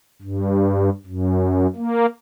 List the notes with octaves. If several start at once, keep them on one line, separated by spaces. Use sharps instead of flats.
G2
F#2
A#3